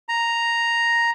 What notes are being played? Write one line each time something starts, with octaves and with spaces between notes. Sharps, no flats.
A#5